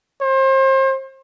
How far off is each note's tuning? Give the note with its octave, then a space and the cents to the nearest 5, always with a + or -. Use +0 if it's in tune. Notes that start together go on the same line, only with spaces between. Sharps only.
C5 +35